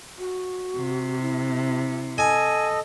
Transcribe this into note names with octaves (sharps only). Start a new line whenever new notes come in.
F#4
C3
E4
A4 D#5 G#5